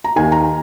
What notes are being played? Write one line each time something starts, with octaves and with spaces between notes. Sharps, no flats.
A#5
D#2 D#3 G#5
A#5